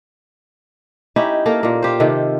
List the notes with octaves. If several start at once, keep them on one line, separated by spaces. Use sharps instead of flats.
C#4 D#4 E4 G4
A#3 A4 A#4
A#2 A#3
F4 G4 C5
C3 D#3 A4